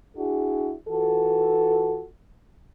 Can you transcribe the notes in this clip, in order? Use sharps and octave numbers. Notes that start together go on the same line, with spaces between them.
D4 E4 F#4 G#4
E3 F4 F#4 A4